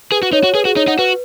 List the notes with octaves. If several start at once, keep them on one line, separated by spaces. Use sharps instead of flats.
G#4 B4
F#4
D#4 C#5
F#4
G#4 B4
F#4 G#4
D#4 C#5
D#4 F#5
F#4 B4